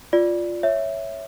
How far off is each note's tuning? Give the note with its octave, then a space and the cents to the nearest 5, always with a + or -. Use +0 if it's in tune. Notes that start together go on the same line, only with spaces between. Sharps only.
F4 +0 D5 +0
C#5 +0 E5 +0